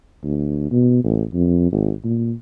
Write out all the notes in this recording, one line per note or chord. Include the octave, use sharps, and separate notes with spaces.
D2
B2
A1
F2
G#1
A#2